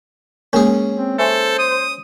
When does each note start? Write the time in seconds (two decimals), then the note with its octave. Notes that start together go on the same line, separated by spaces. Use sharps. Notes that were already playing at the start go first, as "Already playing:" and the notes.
0.53 G#3 A#3 C#4 G#4 A#4
0.96 C4
1.19 A4 C5 E5 G#5 C#6
1.59 D#6